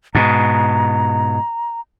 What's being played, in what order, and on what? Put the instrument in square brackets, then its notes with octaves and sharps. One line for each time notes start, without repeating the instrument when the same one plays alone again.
[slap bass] G#2 B2 [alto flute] A#5